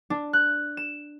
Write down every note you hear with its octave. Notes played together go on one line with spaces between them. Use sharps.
D4
F#6
E7